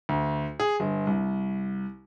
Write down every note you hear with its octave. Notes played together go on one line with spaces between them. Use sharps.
D2
G#4
G1
C2